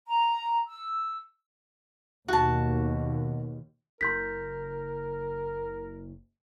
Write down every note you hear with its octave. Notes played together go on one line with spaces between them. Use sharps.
A#5
E6
D#2 B2 F#4 A5
F#1 A#4 C6 G6 B6